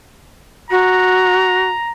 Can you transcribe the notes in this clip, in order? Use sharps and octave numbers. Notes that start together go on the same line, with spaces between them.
F#4 A#5